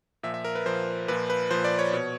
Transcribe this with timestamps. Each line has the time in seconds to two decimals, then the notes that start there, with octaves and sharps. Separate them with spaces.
0.23 A#2 F3 E5
0.34 E5
0.45 A#4
0.55 B4
0.66 A#2 F3 C5
1.08 A#2 F3 B4
1.30 B4
1.51 A#2 F3 C5
1.64 D5
1.79 C#5
1.93 B2